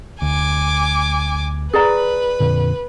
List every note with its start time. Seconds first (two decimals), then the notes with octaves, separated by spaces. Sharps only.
0.22 D2 G#5 D6
1.73 G#4 B4 D5 A#5
2.40 F2 A#2 D3